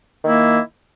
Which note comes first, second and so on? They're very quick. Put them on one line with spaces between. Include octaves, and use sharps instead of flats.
D#3 A#3 E4